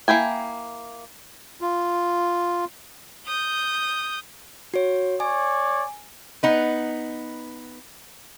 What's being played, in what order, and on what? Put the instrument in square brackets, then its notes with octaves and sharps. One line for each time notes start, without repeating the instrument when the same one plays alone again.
[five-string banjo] A#3 E4 G5 G#5
[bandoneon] F4
[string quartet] D#6 G6
[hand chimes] F#4 C#5
[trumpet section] C#5 D5 [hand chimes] G#5
[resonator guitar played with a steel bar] B3 D#4 B4